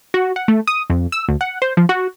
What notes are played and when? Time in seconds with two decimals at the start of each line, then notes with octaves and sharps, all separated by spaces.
0.14 F#4
0.36 F#5
0.48 A3
0.67 D#6
0.90 F2
1.12 E6
1.29 D2
1.41 F#5
1.62 C5
1.77 F3
1.89 F#4